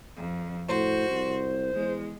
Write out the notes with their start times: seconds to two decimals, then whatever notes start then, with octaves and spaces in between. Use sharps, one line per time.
0.17 F2
0.69 A2 F#4 C5
1.10 C2
1.74 E2 G#3